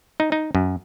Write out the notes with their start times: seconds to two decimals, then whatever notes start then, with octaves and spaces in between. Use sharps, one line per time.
0.20 D#4
0.32 D#4
0.55 F#2